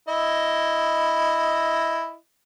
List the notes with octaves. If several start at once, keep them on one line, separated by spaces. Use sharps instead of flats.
E4 D#5